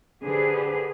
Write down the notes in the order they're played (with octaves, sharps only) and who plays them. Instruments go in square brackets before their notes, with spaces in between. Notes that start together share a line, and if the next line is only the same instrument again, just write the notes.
[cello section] D3 G4 G#4 B4 C5